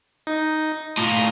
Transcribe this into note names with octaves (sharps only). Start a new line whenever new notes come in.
D#4
A2 F4 A#5 D#6